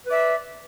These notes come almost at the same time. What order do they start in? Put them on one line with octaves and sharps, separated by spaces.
B4 D5 E5